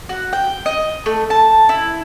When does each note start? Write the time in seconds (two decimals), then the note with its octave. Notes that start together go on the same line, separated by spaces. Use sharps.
0.09 F#4
0.33 G5
0.66 D#5
1.06 A3
1.30 A5
1.69 E4